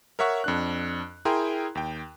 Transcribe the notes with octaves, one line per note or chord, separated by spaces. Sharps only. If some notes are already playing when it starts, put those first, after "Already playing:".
A#4 C#5 E5 F#5 C#6
F2 D4 F#6
E4 G#4 A#4 G5 A#5 C6
D#2 G5